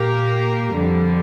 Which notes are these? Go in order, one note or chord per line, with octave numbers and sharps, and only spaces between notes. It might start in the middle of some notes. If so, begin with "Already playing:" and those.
Already playing: A#2 A#3 G4 A#4
F2 D3 G3